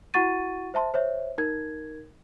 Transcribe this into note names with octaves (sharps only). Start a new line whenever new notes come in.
E4 F#4 F#5 C#6 A6 D#7
C5 E5 A5 C6
C5 C#5 E5
D#4 A#4 G#6